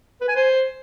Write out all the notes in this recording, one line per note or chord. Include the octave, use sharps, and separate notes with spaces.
B4
G#5
C5